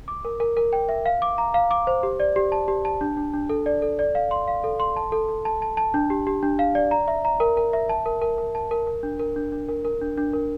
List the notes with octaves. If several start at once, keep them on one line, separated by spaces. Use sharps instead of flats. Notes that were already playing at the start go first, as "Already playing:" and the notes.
D6
A#4
A#4
A#4
G5
E5
F5
D6
A#5
F5
D6
C5
G4
D5
G4
A5
G4
A5
D4
D4
D4
A4
D5
A4
D5
F5
C6
F5
A4
C6
A5
A4
A4
A5
A5
A5
D4
G4
G4
D4
F5
D5
A#5
E5
A#5
A#4
A#4
E5
A5
A#4
A#4
A#4
A5
A#4
A#4
D4
A#4
D4
D4
A#4
A#4
D4
D4
A#4